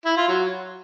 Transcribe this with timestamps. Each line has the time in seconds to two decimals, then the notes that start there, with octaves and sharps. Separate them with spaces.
0.05 E4
0.17 F4
0.28 F#3